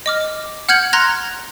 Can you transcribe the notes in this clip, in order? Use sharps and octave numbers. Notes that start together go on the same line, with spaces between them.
D#5 D6 F6
F#5 F6 G6 G#6 C#7 F#7
A#5 C6 F6 F#6 G#6 A#6